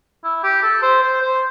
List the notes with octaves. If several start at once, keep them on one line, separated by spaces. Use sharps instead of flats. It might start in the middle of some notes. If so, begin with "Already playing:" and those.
E4
G4
A4
C5
C5
C5